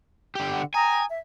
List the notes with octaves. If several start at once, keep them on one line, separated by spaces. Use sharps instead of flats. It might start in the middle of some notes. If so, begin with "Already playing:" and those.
D3 G4
F#5
G5 G#5 A#5 D#6
E5